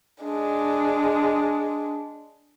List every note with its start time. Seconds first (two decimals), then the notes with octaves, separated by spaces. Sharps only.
0.24 G#3 D4